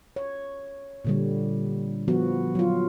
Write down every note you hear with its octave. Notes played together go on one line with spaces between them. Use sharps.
C#5
A#2 D3 G3
F3 B3 F#4
F#3 F4